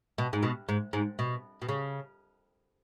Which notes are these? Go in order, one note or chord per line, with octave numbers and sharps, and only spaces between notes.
B2
G#2
B2
G#2
G#2
B2
B2
C#3